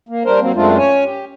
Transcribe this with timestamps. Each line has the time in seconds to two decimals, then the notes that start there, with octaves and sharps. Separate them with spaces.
0.09 A#3
0.25 G3 D4 A#4 C5
0.40 F#3 A#3 C4
0.55 F#2 G#3 A3 C4 D4 F4
0.78 C#4 C#5 G#5
1.05 G4